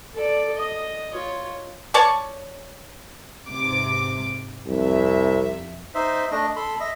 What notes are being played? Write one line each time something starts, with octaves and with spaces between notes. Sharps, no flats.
A4 D5
D#5
F4 C#5
C#5 D5 A5 C#6
G#2 C3 D6
C2 F2 E5
D#4 C5 E5
A3 D4 D#5
A4 B5 C6
D#5 E5